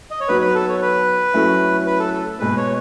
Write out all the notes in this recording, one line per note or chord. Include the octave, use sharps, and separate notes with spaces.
D#5
C#5
F#3 B3 D#4 F#4 B4
B4
A4
C#5
B4
F#3 A3 C#4 E4
B4
A4
A4
B2 G#3 B3 B4
C#5